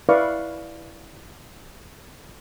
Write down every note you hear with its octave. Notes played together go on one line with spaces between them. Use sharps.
E4 B4 D5 F5 C#6